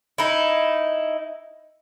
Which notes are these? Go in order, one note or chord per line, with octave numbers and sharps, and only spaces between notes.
D#4 E4